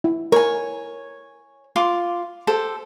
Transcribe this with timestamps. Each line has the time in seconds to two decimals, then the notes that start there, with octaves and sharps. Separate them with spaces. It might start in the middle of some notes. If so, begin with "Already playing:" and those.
0.04 E4
0.32 A#4 C#5 G#5
1.76 F4 C6 D6
2.47 G4 A4 C5